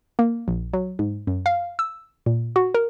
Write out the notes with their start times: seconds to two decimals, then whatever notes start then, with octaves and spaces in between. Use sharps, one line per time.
0.19 A#3
0.48 A#1
0.73 F#3
0.99 G#2
1.27 F#2
1.46 F5
1.79 E6
2.26 A#2
2.56 F#4
2.74 A#4